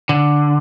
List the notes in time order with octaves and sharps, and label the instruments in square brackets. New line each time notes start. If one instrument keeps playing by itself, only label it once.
[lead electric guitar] D3